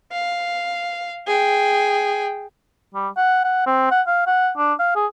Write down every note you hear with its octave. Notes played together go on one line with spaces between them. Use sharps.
F5
G#4 G5
G3
F#5
F#5
C4
F#5
F5
F#5
D4
F5
G#4